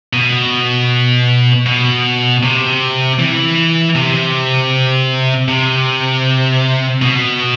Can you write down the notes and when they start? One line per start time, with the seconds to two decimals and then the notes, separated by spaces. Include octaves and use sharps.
0.13 B2
1.66 B2
2.43 C3
3.19 E3
3.95 C3
5.48 C3
7.02 B2